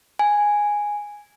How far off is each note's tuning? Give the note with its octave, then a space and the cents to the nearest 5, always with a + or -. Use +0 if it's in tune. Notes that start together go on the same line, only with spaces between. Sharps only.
G#5 -5